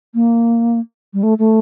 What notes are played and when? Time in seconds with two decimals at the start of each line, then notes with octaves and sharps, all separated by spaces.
0.14 A#3
1.14 G3
1.23 A3
1.39 A3